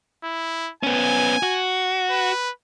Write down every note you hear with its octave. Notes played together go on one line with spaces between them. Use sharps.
E4
B3 C#4 G#5
F#4
B4